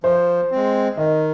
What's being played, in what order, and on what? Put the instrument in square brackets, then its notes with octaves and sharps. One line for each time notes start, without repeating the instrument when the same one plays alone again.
[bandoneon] F3 [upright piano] C5
[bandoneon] G#3 C4
[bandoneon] D#3 [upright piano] D#5